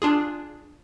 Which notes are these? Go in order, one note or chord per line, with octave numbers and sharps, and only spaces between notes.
D4 F4 G#4